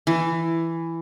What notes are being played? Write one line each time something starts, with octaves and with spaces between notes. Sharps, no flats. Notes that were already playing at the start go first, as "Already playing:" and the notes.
E3